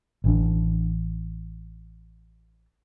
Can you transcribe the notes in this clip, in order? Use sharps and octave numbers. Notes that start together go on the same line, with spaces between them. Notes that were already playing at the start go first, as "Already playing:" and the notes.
A1 E3 D4